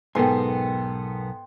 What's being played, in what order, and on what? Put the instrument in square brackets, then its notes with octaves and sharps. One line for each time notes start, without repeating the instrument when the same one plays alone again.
[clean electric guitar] B1 A#4 G#5 [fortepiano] G#2 B3 A4 [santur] G5 C6